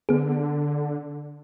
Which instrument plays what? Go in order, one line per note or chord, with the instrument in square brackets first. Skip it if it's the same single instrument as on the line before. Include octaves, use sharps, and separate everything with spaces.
[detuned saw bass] D3 [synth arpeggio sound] B3 G#4